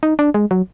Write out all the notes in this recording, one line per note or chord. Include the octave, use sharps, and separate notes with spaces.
D#4
D4
G#3
F#3